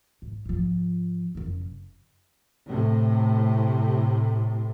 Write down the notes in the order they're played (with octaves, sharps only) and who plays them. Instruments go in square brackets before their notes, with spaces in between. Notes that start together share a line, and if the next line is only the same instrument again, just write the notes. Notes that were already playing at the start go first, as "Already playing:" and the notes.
[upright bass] G#2
G#2 F3
F#1 F2
[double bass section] A2 C3